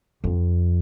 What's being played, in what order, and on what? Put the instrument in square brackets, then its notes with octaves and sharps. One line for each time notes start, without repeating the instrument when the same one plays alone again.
[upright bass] F2